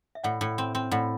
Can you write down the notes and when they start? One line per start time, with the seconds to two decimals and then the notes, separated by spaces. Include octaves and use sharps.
0.15 E5
0.23 A2 D5 F#5
0.41 A2
0.58 C4
0.75 C4
0.91 A2 D5 F#5